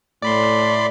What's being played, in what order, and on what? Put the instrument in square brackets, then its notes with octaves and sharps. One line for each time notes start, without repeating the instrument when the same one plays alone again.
[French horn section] A2 A3 [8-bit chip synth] D5 B5 C6